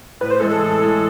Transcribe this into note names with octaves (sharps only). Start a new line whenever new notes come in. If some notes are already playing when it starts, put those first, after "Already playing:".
A2 B4
C5
E3 G#3 A4
A4
A2
E3 G#3